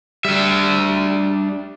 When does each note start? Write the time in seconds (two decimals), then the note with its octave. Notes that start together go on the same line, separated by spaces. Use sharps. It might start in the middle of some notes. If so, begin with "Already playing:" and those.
0.25 G3 D4 E5